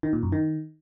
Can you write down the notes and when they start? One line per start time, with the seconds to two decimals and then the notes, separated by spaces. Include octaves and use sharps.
0.03 D#3
0.13 A#2
0.23 F#2
0.32 D#3